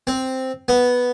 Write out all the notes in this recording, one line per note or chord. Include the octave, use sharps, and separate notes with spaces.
C4
B3